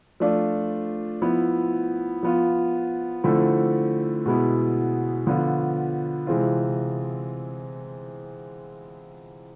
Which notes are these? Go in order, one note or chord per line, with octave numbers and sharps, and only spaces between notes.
F3 A3 D4 F4
F3 B3 E4
F3 B3 F4
D3 F3 A3 C4 E4
B2 G#3 B3 E4
D3 F3 B3 F4
C3 E3 G#3 C4 F4